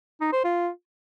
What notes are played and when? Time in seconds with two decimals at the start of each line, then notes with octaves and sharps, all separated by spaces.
0.21 D#4
0.32 C5
0.44 F4